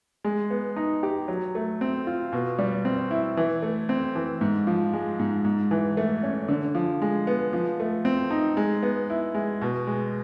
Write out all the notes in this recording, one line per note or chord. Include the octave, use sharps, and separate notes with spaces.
G#3
B3
D#4
G4
F#3
A3
C4
F4
B2
G3
C4
E4
E3
A3
C4
E3
G#2
F3
G#3
G#2
G#2
E3
A3
C#4
D3
F3
G#3
B3
F3
A3
C4
D#4
G#3
B3
E4
G#3
B2
G#3